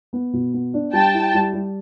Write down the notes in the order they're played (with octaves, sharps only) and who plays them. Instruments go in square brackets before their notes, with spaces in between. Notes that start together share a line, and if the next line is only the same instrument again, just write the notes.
[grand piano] B3
B2
B3
D4
[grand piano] G3 [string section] G5 A5
[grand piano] E4
G3
G3